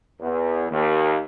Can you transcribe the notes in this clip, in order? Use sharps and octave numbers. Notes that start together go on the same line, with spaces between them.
E2
D#2